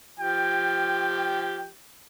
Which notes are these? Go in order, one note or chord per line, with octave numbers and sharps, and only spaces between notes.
F3 G4 G5